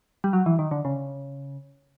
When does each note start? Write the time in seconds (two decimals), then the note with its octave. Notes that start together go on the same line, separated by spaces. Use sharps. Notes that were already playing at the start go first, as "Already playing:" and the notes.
0.24 G3
0.33 F#3
0.46 E3
0.59 D#3
0.71 D3
0.85 C#3